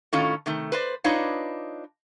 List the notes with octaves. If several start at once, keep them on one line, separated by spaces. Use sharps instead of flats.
A2 D#3 C#4 F4 A4
C3 D#3 A3
B4 C5 D5
D4 D#4 F4 B4 C#5 D#5